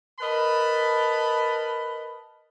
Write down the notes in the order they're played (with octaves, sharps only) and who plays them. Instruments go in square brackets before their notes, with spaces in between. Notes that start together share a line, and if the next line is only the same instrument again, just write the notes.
[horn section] A#4 B4 D#5 A5 B5